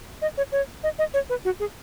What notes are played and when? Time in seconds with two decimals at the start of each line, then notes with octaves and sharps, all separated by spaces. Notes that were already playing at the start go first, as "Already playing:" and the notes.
0.22 D#5
0.37 C#5
0.52 C#5
0.83 D#5
0.99 D#5
1.14 C#5
1.29 B4
1.45 F#4
1.60 G#4